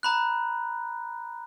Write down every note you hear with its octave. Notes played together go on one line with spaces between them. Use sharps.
A#5 B5 F#6